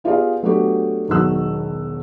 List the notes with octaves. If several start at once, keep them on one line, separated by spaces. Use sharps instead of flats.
B3 F4 G4 G#4 D5 F5
F#3 A3 B3 D4 F#4 G4
E1 B1 D#3 F#3 E6 F#6